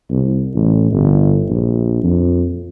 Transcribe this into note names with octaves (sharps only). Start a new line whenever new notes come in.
C2
A1
G1
A#1
F2